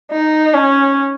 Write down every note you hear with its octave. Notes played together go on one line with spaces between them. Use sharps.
D#4
C#4